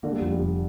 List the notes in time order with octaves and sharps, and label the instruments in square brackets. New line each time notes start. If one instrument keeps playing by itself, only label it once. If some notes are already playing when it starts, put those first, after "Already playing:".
[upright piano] D3 [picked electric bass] A#3
[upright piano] G3
[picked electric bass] F2 [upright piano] F3
[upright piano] G3
[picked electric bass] F1